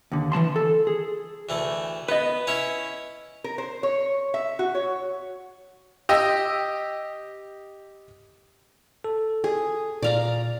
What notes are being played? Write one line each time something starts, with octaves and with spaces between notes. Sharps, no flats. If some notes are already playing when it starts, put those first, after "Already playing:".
D#2 D3
E3 G#3 A5 C6
A4
G#4
D2 E3 A3
B3 B4 D#5
C#4 E4 C#5
A#4
C5
C#5
E5
F#4
C#5
G4 D#5 E6
A4
G#4
A#2 D5 F5 A#5